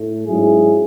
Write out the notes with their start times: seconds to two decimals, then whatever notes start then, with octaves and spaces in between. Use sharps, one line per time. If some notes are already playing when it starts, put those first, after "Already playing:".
Already playing: A2 A3
0.25 G#2 F#3 C#4 E4 G#4